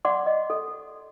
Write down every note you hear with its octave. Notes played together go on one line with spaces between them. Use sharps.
D5 F#5 C6 D6
D#5
A4